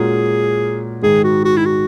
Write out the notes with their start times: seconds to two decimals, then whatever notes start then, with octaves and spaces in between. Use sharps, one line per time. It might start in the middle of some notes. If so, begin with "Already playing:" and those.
Already playing: A#2 G#3 C#4 F#4 G#4 A#4
1.02 G#2 D#3 G#3 G#4
1.24 F#4
1.45 F#4
1.57 E4
1.65 F#4